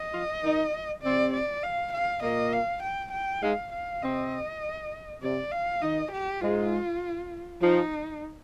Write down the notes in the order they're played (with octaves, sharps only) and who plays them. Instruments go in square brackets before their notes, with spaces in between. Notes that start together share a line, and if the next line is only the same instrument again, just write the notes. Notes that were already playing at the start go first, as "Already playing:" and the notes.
Already playing: [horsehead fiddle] D#5
[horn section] F3 F4
D#3 D#4
[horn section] C3 C4 [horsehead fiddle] D5
[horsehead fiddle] D5
F5
F5
[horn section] A#2 A#3 [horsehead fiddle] D#5
[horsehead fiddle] F5
G5
G5
[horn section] G#2 G#3 [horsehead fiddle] F5
[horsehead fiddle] F5
[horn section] C3 C4 [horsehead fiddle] D#5
[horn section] C3 C4 [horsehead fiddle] D5
[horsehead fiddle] F5
[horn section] D#3 D#4 [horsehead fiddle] D#5
[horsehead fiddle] G4
[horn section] G#2 G#3 [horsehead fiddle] F4
[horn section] F3 [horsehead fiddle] D#4